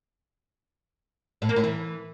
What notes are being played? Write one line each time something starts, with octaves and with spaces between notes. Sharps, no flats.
A2
A#3
A2
E3